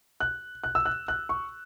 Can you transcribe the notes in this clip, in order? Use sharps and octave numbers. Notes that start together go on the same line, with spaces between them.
F#6
F#6
E6
F#6
F#6
C#6